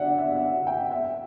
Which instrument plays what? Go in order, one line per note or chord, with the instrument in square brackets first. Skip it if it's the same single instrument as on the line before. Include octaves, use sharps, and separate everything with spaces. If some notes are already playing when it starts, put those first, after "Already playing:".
Already playing: [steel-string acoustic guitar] D3 F#3 G4 D5 [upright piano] E5 F#5
[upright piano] E5
E5
F#5
G5
E5